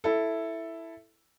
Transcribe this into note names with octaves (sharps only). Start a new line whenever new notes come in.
E4 A4